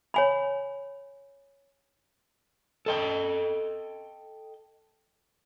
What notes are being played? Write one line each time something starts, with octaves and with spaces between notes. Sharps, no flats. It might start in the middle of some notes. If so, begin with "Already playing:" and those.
C#5 G#5 B5
A4 D#5 G5